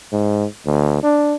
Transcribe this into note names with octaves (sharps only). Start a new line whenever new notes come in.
G#2
D2
D4